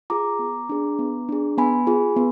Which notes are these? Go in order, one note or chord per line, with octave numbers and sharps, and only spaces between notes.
F4 G#4 A#5 D6
B3
D4 G#4
B3
D4 G#4
B3 G#5 B5
F4 G#4
B3